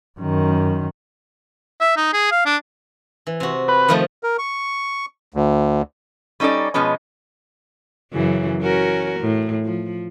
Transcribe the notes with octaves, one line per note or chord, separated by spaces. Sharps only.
F#2 D#3
E5
D#4
G#4
F5
D4
E3
C3 F#4
B4
D#3 F3 A3
A#4
C#6
D2
G3 C#4 D#4 A4 D5
B2 F3 G#3 B3 C#4
F#2 C#3 E3
C#4 F#4 A#4
A2
F3